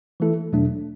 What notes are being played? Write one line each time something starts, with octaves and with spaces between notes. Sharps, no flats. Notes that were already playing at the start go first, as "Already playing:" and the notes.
E3 A3 E4 A4
E2 B2 F#3 A3 D4